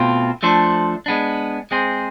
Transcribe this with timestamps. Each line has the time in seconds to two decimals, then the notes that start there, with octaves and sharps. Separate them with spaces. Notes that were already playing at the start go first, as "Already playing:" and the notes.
Already playing: B2 A3 C4 F4
0.43 F3 A3 D4 A4 C5
1.06 G#3 B3 D4
1.71 G#3 C4 G#4 C5